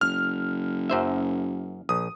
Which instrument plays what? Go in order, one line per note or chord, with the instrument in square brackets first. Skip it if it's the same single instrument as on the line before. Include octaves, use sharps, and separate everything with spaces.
[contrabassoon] F#1 [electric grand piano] F6
[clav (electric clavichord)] F#2 C5 E5
[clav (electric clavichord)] A#1 [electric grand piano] D#6